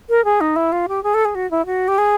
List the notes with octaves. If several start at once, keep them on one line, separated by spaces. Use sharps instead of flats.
A#4
G#4
D#4
E4
F4
G4
G#4
A4
G#4
F#4
E4
F#4
G4
G#4